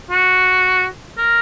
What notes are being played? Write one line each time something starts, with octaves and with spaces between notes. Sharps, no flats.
F#4
A#4